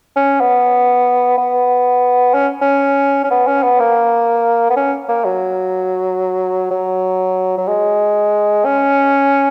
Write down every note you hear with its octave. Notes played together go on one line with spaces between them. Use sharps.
C#4
B3
B3
C#4
C#4
C#4
B3
C#4
B3
A#3
B3
C#4
A#3
F#3
F#3
F#3
G#3
C#4